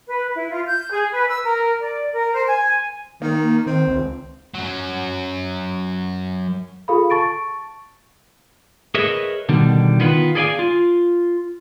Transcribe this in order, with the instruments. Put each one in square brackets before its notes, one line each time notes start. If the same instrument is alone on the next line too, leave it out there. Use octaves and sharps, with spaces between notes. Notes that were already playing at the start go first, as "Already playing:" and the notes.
[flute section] B4
E4
F4
G6
G#4
B4
E6
A#4
D5
A#4
C5
G#5
[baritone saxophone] D#3 [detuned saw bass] A#3
[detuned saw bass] D#3 [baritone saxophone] C4
[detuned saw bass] C#2
[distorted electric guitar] F#2 F#3
[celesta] F4 G#4 A4 F5 B5
A5 C#6 A6 D7
[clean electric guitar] G#4 A#4 B4 C#5 D#5 E5
B2 D3 D#3 G3
D#3 B3 F4 B4
G#4 A4 D5 D#5 F5 G#5
F4